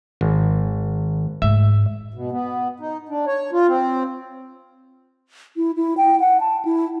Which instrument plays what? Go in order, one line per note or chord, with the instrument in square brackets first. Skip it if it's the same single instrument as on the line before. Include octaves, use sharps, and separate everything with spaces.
[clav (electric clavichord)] G#1
[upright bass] G#2 A3 [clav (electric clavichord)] E5
[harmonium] B2
B3
D#4
D4
C#5
F4
C4
[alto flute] E4
E4
G5
F#5
A5
E4